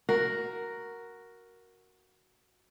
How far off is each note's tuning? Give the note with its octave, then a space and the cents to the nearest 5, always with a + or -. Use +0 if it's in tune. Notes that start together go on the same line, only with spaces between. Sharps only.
F#4 +0 A#4 +0